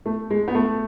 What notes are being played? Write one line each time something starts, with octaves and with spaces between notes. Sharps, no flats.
A3
G#3
B3
A3